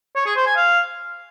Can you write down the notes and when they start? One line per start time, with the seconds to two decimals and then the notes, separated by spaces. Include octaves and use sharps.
0.16 C#5
0.26 G#4
0.36 C5
0.46 G#5
0.56 F5